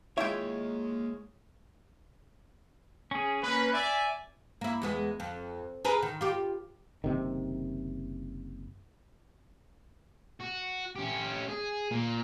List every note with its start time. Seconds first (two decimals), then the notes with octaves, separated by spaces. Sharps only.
0.18 G#3 A#3 E4 F4 C#5 D#5 E5 G5
3.11 C#4 G#4
3.43 A#3 C#4 B4
3.74 D5 E5 G#5
4.61 A#3 E4
4.82 E2 G#3 B3
5.20 F2
5.84 G#4 A#4 B4
6.02 D#3
6.21 F4 G4
7.04 F#1 C3 D#3
10.40 F#4
10.96 C#4 G4
11.49 G#4
11.91 A#2